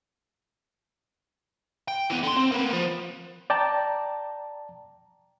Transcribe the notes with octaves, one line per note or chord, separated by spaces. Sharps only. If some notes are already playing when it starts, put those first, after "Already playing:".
G5
E3 B3
D3 C6
C4
A#3 B3
F3
D5 G5 A5 A#5